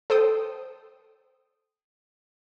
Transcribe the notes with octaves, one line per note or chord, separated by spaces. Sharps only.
A4 C5 G5 D#6